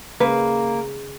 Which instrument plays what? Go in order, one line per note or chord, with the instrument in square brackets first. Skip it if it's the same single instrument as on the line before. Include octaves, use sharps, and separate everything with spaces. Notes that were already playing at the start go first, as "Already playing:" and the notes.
[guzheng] C#3 G#3 [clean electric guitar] A#3 [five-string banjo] B4